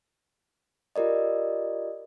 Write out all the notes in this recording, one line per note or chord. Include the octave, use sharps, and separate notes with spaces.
F4 G4 A#4 D5 D#5